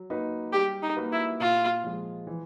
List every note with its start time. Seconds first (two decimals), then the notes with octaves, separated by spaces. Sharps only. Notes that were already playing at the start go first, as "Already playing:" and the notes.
Already playing: F#3
0.10 A#3 D#4 F#4 B4
0.53 G3 G4
0.82 D#4
0.97 A#3 D#4 F#4 B4
1.12 E4
1.40 A#2 F4
1.84 F3 G#3
2.27 E3